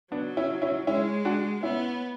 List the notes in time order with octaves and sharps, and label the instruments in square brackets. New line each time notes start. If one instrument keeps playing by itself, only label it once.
[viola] F#3 [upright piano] B3 D4
[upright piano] C#4 E4
C#4 E4
[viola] G#3 [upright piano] C#4 E4
[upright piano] D4 F#4
[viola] B3 [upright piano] C#4 E4